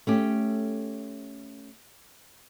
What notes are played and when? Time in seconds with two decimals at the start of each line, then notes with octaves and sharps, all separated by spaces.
0.07 A3 C#4 G4